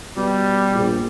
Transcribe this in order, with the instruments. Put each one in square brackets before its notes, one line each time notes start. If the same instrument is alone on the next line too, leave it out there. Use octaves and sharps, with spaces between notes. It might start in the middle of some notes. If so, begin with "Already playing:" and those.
[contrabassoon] B2 [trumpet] G3
[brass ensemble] A#1